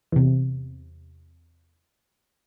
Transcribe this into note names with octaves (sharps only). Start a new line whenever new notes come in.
E2 C3